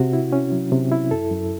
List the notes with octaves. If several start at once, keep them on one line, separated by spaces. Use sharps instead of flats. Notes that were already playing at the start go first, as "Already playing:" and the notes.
Already playing: C3 F#4
E4
C#4
F#3
C3
E4
F#2 A4
F#2